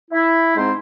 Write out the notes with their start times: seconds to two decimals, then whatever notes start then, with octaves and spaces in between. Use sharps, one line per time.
0.11 E4
0.55 G#2 G#3 C4 C5